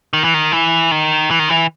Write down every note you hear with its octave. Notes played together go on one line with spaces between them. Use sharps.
D#3
E3
D#3
E3
D#3
E3
D#3
E3